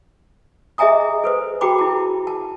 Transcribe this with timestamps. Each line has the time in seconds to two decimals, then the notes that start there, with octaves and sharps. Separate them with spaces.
0.78 G#4 D#5 E5 G#5 A#5 D#6
1.24 A4 B4 C5
1.61 F#4 G#4 G5 A#5 B5 D6
1.79 E4 A5
2.27 A5